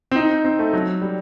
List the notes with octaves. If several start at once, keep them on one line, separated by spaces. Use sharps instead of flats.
C4
D#4
C4
A3
F#3
G3